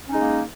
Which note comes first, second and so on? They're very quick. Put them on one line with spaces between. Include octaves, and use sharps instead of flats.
C#4 D#4 G#3 A#3